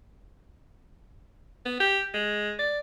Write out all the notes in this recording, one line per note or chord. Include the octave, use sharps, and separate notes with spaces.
B3
G4
G#3
D5